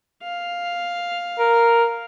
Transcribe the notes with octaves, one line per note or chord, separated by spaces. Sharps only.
F5
A#4